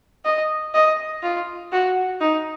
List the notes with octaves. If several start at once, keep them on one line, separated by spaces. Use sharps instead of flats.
D#5
D#5
F4
F#4
D#4